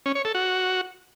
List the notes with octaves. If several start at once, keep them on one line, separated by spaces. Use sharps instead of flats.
C#4
C#5
A4
F#4